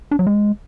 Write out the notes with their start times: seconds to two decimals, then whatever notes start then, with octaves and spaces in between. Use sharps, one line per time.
0.11 D4
0.19 F#3
0.27 G#3